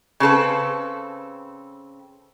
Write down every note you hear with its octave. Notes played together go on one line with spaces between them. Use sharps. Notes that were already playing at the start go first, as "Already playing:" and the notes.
C#3 C4 A4 B4